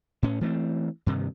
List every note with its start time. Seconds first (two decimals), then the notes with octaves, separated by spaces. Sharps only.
0.23 A2 C#4
0.41 E3 A3 B3 C4
1.06 G2 C3 D#3